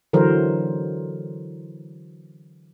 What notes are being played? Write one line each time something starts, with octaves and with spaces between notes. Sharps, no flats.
D3 E3 F#3 A#4 C5